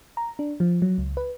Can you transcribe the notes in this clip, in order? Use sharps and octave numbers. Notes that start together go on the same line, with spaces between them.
A#5
D4
F3
F#3
C#2
B4